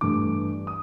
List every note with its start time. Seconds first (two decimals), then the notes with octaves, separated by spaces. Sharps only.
0.01 G2 E3 A3 D4 D6
0.67 D#6